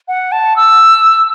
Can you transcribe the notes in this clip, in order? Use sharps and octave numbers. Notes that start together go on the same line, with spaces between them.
F#5
A5
E6